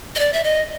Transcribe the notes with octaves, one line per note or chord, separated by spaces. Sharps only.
D#5
D5
E5
D#5